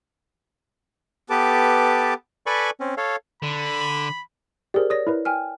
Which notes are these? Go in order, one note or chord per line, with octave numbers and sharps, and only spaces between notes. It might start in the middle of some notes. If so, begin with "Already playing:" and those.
B3 G4 A4 B4 A5 D6
A4 B4 D5 G#5 B5 C#6
C4 C#4
A4 C#5 F5
D3 B5
G4 G#4 A#4 C5 D5
C#5 D5 D#6 A#6
E4 A#4 B4
G5 G#5 F6